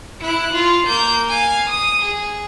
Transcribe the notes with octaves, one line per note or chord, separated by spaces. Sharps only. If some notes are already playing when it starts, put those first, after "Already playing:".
E4 F#6
F4
A#3 G6
F5 G#5
D#6 D#7
G#4